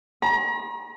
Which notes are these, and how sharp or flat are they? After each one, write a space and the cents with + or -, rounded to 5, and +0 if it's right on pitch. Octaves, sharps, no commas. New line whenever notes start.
A#5 +40